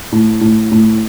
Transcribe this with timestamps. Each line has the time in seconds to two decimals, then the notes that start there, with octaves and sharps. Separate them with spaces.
0.12 A2
0.41 A2
0.72 A2